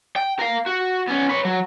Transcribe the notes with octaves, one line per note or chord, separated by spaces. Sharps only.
G5
A#4 F5
F#4
B3 C#4
B4 C#5
F#3